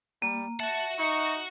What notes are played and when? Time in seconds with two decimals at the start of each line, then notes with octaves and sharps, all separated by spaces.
0.22 G3 A#3
0.60 F#4 E5 F#5 A5
0.99 D#4 C#6